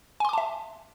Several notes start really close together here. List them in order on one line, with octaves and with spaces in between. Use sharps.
G#5 C6 D6 A5 E5